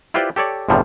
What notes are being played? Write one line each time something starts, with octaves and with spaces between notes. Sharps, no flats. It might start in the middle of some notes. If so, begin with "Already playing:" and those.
E4 F4 G4 B4 C5 D5
G4 A4 C#5 D5
G1 E2 A2 C3 F3 G3